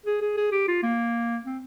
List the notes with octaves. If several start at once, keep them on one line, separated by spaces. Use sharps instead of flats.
G#4
G#4
G#4
G4
F4
A#3
C4